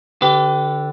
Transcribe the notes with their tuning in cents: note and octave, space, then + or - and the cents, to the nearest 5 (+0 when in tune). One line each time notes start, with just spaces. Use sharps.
D3 +0 G4 -20 B4 +30